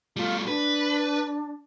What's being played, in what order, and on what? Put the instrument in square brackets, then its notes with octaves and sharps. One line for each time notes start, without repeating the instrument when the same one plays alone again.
[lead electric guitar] G3 A3 [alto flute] F4
[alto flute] D4 [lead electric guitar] B4